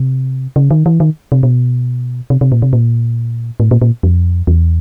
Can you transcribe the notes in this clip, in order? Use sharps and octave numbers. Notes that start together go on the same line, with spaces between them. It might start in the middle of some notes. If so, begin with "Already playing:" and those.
Already playing: C3
C#3
D#3
E3
D#3
C3
B2
C3
C3
A#2
C3
A#2
A2
A#2
A#2
F2
E2